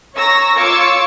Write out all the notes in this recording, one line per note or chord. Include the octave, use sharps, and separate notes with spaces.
C#5 A#5 C#6 E6 A#6
F4 C#5 C#6 D6 E6 C#7